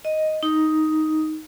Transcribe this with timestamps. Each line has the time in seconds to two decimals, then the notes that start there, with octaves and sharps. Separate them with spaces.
0.05 D#5
0.43 D#4